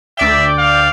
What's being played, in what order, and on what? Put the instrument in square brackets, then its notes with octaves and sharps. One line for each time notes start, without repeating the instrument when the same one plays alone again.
[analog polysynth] D2 D5 G5 [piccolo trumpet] E5
[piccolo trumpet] F5